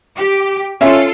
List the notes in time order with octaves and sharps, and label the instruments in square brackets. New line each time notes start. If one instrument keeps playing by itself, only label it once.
[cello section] G4
[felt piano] C#4 E5 [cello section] F4 A4